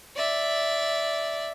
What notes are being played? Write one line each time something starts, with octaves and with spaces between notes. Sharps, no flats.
D5 E5